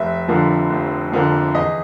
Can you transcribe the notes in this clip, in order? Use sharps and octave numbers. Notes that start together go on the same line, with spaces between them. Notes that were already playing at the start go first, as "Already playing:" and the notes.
Already playing: F1 E5
F2 D3 F3 A#3
F1
F2 D3 F3 A#3
E2 D#5